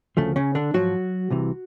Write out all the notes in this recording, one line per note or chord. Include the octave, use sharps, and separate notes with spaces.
D2 C#3 F3 A3
C#3 C#4
D3 D4
G#2 F3 F#3 F#4
C2 C3 E3